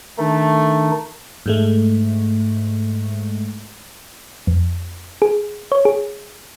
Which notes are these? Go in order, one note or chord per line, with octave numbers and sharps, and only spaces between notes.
D#3 A3 D4 D#4
G#2 G#3 A3
F2
G#4
C#5
G#4